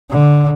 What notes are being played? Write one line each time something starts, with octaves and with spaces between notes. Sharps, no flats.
D3